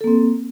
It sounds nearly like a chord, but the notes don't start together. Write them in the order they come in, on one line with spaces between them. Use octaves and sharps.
A4 A#3 C4